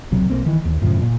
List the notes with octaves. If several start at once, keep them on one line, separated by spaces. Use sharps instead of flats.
D#1 B1 C3 F#3
B1 A#3 C4
D#3 E3
D#2
F#2 A2 C#3 F3
A#2